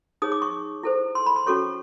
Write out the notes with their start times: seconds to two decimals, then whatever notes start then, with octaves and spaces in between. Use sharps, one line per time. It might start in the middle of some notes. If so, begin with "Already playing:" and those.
0.22 D#4 G#4 C#5 D#6
0.32 D6
0.42 C#6
0.83 E4 A4 C5
1.15 C6
1.26 B5
1.36 C6
1.46 C#4 F#4 A4 C#5 C#6